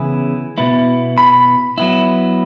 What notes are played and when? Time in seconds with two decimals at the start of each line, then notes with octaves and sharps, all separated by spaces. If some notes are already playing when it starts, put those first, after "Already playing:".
Already playing: C#3 E3 B3 E4 G#5
0.58 B2 B3 E4
1.18 B5
1.78 F#3 B3 E4